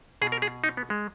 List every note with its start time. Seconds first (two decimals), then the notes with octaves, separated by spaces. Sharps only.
0.22 B2 G#4
0.32 A#4
0.42 G#4
0.64 D#4
0.77 B3
0.90 G#3